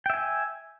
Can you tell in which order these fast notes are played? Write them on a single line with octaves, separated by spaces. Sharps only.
G5 E5 G#5